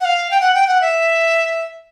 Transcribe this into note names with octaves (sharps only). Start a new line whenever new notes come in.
F#5
F5
G5
F#5
G5
F#5
E5